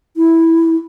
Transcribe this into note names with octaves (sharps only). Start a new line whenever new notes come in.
E4